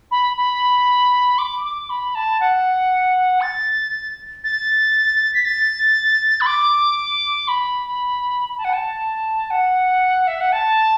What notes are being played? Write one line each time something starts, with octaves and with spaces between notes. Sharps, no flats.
B5
B5
D6
D6
B5
A5
F#5
A6
A6
B6
A6
B5
D6
B5
B5
A5
F#5
A5
F#5
E5
F#5
A5